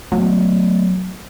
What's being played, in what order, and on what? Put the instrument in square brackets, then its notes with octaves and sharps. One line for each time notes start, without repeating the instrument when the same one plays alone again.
[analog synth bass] F#3 [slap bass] A3 B3